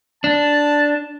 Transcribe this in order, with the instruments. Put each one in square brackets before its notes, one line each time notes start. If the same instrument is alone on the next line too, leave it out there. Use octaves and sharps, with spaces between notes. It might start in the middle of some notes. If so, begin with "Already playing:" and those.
[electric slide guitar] D4 [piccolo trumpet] A5